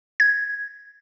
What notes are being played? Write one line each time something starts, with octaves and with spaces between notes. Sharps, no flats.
G#6